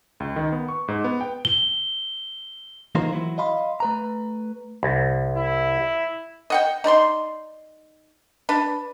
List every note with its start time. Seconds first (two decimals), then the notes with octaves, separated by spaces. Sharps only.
0.20 C#2
0.36 D#3
0.52 B3
0.68 C#6
0.88 G#2
1.04 B3
1.21 G5
1.45 G7
2.95 E3 A#3 D#4 F4 A#4 C5
3.12 E3 F#3 E4
3.38 D#5 F5 B5 C6
3.80 A3 B4 A#5
4.83 C2
5.36 E4
6.50 D#5 F#5 G5
6.84 D#4 D5 B5 C6
8.49 D4 B4